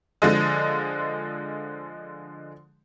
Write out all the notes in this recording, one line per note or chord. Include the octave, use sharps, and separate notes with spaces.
D3 F3 G#3